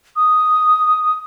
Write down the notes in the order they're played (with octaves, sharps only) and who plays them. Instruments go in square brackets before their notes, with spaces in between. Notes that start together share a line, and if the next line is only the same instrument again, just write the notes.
[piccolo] D#6